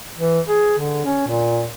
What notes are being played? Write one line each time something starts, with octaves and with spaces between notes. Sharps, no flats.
E3
G#4
D3
C#4
A#2